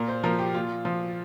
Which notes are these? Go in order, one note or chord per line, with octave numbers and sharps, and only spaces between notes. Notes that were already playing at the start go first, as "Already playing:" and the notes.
Already playing: A#2 A#4
C5
F3 A#4
G4
A#2 F4
F3